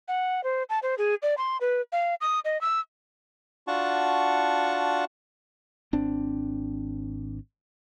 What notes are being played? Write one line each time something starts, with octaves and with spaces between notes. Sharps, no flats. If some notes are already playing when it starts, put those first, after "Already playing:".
F#5
C5
A5
C5
G#4
D5
C6
B4
F5
D#6
D#5
E6
D4 F4 F#4 F#5 A5 C#6
G#1 C4 D4